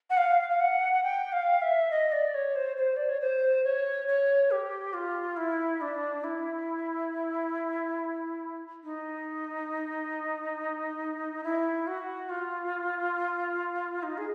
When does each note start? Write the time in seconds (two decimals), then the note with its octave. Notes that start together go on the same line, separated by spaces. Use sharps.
0.10 F#5
0.17 F5
0.50 F5
0.60 F#5
0.92 F#5
1.03 G5
1.32 F5
1.62 E5
1.91 D#5
2.12 D5
2.34 C#5
2.56 C5
2.77 C5
2.97 D5
3.09 C#5
3.21 C5
3.64 C#5
4.08 C#5
4.51 G4
4.94 F4
5.37 E4
5.81 D4
6.24 E4
8.84 D#4
11.44 E4
11.87 F#4
12.29 F4
14.03 D#4
14.18 G#4